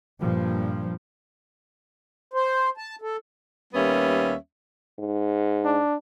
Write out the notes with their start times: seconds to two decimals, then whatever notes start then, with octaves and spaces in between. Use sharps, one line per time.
0.20 G2 A#2 F3
2.34 C5
2.77 A5
3.02 A4
3.73 D#2 G3 A#3 B3 C#4 E5
4.99 G#2
5.65 D4